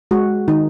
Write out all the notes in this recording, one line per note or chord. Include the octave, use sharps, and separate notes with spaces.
G#3 F#4
D#3 D#4